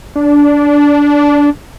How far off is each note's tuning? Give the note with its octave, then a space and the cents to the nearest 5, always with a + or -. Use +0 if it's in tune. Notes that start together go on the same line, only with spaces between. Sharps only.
D4 -15